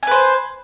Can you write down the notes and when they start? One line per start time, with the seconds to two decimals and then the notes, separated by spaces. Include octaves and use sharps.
0.03 G#5
0.07 B4
0.11 C5